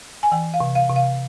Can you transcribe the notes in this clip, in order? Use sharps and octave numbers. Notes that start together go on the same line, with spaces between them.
G#5
E3 G5
F5
C3
F5
C3
F5